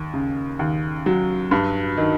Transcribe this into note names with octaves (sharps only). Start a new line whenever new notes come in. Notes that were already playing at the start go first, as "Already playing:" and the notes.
Already playing: D#2
C#3
D#2
F#3
G2
D#3